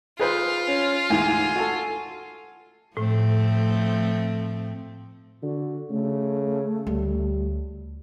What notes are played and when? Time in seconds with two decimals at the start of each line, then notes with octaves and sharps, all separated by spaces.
0.19 F4 G#4 B4 C5
0.68 C#4
1.10 D2 G#2 E3 G#5
1.56 F#4 A4
2.97 A2 F3 A3 C4
5.43 D3 F#4
5.90 C#3 A3
6.87 D2 G3